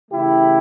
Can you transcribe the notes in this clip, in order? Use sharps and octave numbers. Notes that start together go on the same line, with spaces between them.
C#3 E3 A3 E4 G4